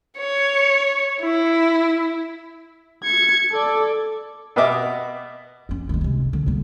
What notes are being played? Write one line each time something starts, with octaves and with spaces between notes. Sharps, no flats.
C#5
E4
G#6 C#7
A4 D5
B2 B3 D#5 E5 D6
F2 C#4
D#3 G#3
C3 G#3
D3
G3 B3